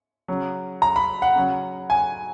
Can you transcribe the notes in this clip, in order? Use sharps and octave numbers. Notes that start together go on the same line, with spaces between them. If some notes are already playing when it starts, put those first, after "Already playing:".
C#3 F#3
A#5
B5
F#5
C#3 F#3
G#5